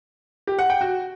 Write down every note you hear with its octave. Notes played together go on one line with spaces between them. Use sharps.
G4
F#5
G5
F#4